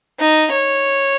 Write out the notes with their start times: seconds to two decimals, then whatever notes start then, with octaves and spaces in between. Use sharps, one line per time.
0.19 D#4
0.52 C#5